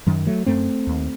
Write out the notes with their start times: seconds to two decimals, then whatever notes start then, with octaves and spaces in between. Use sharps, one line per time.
0.07 F#2 D#3 F#3
0.27 F#3 A3
0.46 F#2 A3 C4
0.87 D#2